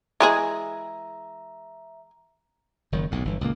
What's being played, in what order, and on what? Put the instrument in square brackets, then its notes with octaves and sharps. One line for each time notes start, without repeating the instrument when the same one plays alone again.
[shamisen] E3 G#3 G#4 [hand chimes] E5 A#5
[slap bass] F#1 D#3 F#3
B1 A2
G1 E3
C#2 A#2 A#3